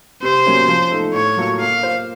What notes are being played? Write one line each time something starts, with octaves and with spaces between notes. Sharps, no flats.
C3 C5
F#3 A#3 C#4
F3
A3 D#4 A4
A2 C#5
F#3 A#3 F4 A4
A#3 F5
F4 C5